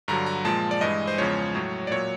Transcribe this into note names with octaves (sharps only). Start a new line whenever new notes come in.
G2 D3 F#3 A#5
A#5
A#2 F3 G#3 A5
D5
G2 E3 G#3 D#5
C5
E2 C#3 F3 G#3 C#5
A2 F#3
D5
A#2 F#3 C#5